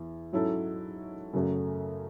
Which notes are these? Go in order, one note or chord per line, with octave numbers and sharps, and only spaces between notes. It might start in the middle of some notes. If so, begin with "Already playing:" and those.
Already playing: E2
G#2 F#3 C#4 E4 A4
F#2 C#3 F#3 A3 C#4